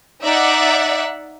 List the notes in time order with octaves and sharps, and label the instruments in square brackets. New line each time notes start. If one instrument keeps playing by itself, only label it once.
[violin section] D#4 D5 E5 F#5